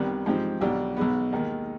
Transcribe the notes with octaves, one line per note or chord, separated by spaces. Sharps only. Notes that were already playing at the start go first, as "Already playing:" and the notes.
Already playing: C2 C3 D#3 G3 B3
G#2 F3 C4 G4
B1 B2 G3 D4 G4
B1 B2 G#3 B3
D#2 D#3 G#3